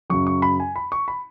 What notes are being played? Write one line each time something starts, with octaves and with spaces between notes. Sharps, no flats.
F#2 C#3 F#3 C#6
C#6
B5
G#5
B5
C#6
B5